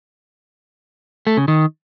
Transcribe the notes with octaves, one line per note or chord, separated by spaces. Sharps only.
A3
C#3
D#3